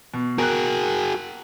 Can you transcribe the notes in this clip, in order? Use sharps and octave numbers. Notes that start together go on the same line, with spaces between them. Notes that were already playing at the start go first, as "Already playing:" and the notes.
B2
F#4 G#4 A#4 F#6